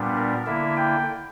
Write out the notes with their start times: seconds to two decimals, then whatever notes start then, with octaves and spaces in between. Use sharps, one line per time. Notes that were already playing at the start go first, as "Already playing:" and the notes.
Already playing: A#2 G3 B3 D4
0.15 A#4
0.46 D3 A#3 E4 E5
0.77 G5